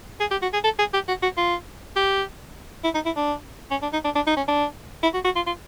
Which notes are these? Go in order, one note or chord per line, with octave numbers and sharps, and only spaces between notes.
G#4
G4
F#4
G#4
A4
G#4
G4
F#4
F#4
F4
G4
E4
D#4
E4
D4
C#4
D4
D#4
D4
D4
D#4
C#4
D4
E4
F#4
F#4
F4
F4